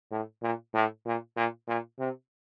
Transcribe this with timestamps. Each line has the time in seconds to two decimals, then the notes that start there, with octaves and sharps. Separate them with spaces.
0.11 A2
0.43 A#2
0.74 A2
1.06 A#2
1.36 A#2
1.68 A#2
1.99 C3